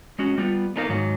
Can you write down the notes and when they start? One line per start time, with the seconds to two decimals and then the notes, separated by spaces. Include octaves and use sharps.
0.19 G#3 C#4 F#4
0.38 G3 B3 F4
0.76 A3 B3 D4 D#4 A#4 F5
0.89 G#2 D#3 F#3